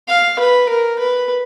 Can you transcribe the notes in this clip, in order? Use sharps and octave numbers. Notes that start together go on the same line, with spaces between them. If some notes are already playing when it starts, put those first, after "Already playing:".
F5
B4
A#4
B4